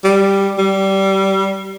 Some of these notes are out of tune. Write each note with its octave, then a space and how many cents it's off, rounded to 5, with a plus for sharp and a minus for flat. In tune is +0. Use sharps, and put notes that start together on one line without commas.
G3 +5
G3 -20